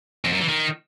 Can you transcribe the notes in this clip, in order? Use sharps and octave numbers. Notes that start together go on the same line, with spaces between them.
F2
F#2
E3
D#3